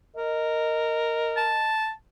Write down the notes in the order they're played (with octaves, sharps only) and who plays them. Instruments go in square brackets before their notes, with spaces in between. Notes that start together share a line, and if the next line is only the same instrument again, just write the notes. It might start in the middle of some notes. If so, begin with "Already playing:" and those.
[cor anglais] A#4 [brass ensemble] D#5
[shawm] A5